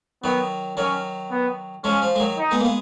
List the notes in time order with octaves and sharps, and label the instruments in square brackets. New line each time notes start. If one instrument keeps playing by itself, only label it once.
[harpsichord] D#3 F#3 [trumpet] B3
[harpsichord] D#3 F#3 [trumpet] C#4
[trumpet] B3
[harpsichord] F3 G#3 [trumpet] C#4
[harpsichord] F3
G#3
D#3 F#3
[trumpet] D#4
[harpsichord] G#3 B3
A#3
G#3 B3